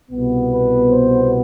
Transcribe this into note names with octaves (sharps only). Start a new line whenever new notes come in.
C2 B2 B3
B4
C5